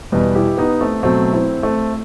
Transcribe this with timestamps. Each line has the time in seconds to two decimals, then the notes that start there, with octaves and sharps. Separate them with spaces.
0.12 E2 B2 G3 B4 D#5
0.35 E4 G4
0.58 B3 D#4
0.80 A3 C4
1.03 B2 F#3 A3 C4
1.33 C4 E4
1.63 A3 C4